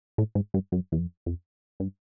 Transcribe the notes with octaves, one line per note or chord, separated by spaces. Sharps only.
A2
G#2
G2
F#2
E2
F2
F2
G2